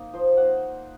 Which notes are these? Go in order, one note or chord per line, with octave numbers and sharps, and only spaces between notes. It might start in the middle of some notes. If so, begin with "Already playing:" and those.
Already playing: A#3 D#4
F3 C5
A#3 D#4 F#5